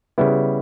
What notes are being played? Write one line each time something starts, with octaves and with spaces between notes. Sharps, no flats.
C#3 G3 B3 E4